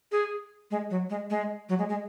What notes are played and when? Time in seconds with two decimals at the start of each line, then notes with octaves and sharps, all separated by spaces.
0.12 G#4
0.71 G#3
0.90 F#3
1.10 G#3
1.30 G#3
1.69 F#3
1.79 G#3
1.89 G#3